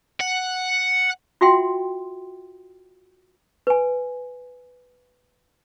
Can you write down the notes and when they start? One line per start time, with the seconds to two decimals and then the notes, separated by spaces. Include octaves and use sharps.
0.21 F#5
1.41 F4 F#4 E5 F#5 G5 C6
3.67 B4 G#5